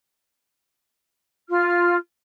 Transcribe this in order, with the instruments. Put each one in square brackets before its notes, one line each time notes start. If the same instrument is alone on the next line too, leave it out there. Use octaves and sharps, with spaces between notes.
[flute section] F4 F6